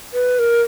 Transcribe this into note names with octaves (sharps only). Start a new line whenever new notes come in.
B4
A#4